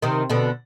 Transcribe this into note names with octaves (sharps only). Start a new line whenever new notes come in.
C3 D#3
B2 D3